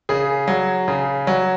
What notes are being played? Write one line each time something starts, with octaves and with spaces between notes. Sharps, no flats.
C#3 G#4
F#3
C#3
F#3